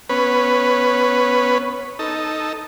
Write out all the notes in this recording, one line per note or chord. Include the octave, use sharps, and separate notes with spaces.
B3 C#4 B4
D#4 A4